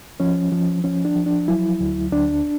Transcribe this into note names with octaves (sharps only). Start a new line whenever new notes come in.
F3 C#4
F3
F3 C#4
D4
F3
D4
F#3 E4
D2
D2 D4